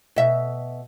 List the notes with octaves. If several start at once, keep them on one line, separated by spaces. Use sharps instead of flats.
B2 E5